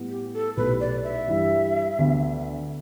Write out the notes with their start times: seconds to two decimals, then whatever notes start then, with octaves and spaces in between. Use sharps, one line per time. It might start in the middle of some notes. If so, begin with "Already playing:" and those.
Already playing: A2 G3 B3
0.09 G4
0.33 A4
0.57 B1 B2 A3 E4 G4 B4
0.80 D5
1.04 E5
1.27 G2 E3 G3 E4
1.98 D2 D3 B3 D4